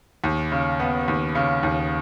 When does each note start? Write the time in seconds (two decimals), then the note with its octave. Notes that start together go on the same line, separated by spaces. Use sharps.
0.24 D#2
0.52 C#3
0.80 B3
1.08 D#2
1.35 C#3
1.63 D#2